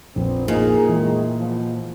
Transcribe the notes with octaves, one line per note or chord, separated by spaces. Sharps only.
A#1 F2 A#2 B3 C4
A#2 D#4 G#4
A2 D#3 E3 G#3
B2 F3